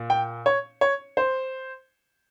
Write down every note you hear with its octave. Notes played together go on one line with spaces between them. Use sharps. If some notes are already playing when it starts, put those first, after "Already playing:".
Already playing: A#2
G5
C#5
C#5
C5